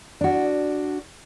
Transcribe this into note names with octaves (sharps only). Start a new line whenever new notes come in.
D4 F#4